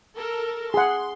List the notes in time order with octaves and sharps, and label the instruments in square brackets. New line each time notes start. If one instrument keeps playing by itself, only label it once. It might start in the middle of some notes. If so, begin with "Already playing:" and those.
[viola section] A4 A#4
[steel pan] G#4 F#5 [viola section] C6